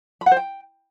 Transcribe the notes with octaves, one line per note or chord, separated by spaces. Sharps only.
B5
F#5
C5
G5